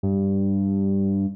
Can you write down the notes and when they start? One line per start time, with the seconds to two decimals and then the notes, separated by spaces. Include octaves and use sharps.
0.03 G2